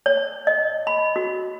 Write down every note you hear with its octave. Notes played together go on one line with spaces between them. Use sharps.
C#5
D#5
B5
F#4